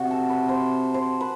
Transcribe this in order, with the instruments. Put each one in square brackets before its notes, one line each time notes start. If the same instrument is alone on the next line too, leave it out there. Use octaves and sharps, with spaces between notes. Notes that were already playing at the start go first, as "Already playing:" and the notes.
Already playing: [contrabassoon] C3 [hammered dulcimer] F#4
[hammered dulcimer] A4
B4
C5
C5
B4